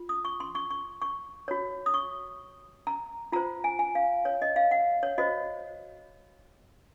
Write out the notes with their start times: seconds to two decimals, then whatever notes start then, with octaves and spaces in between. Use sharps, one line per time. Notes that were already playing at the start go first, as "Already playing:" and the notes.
Already playing: F4
0.09 D#6
0.25 C#6
0.40 C6
0.55 C#6
0.71 C#6
1.02 C#6
1.48 F#4 C#5
1.86 D#6
1.94 C#6
2.87 A#5
3.32 F4 C5 A#5
3.64 G#5
3.79 G#5
3.95 F5
4.25 C#5
4.42 D#5
4.56 F5
4.71 F#5
5.03 C#5
5.18 F#4 C5 D#5